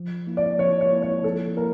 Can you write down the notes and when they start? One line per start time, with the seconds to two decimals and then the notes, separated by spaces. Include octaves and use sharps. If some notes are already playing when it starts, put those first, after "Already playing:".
Already playing: F3
0.27 A#3 E4
0.37 D5
0.59 F3 C#5
0.81 C#5
0.92 A#3 E4
1.02 C#5
1.23 F3 A4
1.57 A#3 E4 A#4